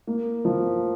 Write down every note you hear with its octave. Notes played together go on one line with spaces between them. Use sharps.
A#3
F3